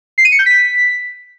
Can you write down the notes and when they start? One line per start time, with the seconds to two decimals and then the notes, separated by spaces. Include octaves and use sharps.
0.18 C7
0.25 D#7
0.32 C#7
0.39 G6
0.46 B6